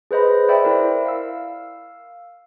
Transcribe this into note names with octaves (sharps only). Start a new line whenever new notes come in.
G#4 B4 C5 D#5 B5
C5 D5 E5 G5 B5
E4 A#4
F5 E6